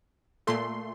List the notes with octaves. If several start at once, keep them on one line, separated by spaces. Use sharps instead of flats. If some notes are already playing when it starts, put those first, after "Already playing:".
A#2 A3 C6